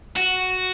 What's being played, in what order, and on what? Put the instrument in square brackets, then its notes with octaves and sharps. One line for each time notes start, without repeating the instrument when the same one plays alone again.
[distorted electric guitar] F#4